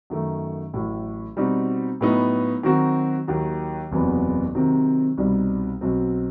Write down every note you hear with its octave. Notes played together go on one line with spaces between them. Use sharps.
F#2 D#3 A3
A1 A2 F#3
B2 G3 C4 D#4 F#4
A2 F#3 B3 D#4
D#3 F#3 C4 F#4
D#2 D#3 F#3
F#1 E2 C3 F#3 B3
C3 D#3 F#3 C4
C2 B2 G3 C4 D#4
B1 B2 F#3 C4